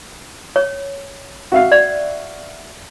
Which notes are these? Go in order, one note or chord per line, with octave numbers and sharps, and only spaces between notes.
C#5
F#4 E5 F5
D5